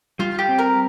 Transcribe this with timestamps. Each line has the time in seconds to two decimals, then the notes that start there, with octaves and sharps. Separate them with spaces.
0.19 G3 F4
0.39 G4
0.49 C4
0.58 A#4